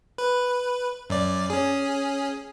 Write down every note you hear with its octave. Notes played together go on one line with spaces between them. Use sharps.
B4
F#2 D5
C#4 G#4